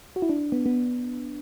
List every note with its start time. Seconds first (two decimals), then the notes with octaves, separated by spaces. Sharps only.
0.16 F#4
0.22 E4
0.29 D4
0.52 B3
0.66 B3